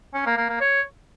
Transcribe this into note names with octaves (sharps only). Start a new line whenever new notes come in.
C#4
A#3
A#3
A#3
C#5